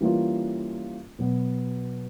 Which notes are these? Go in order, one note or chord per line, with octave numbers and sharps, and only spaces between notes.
E3 G3 A#3 C#4 F4
B2 F#3 B3